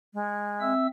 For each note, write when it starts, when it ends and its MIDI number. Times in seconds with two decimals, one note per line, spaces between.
0.14 0.73 56
0.61 0.87 60
0.61 0.87 76
0.61 0.87 88